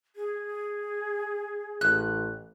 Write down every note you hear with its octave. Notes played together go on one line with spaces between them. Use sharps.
G#4
A1 F#6